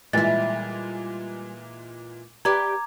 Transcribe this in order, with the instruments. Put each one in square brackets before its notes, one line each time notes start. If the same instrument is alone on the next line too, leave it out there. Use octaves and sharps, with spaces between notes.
[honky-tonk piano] A#2 E3 G#3 [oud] G3 E4 [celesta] A6
[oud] G4 B4 D5 [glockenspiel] A#5 D6 [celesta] G#6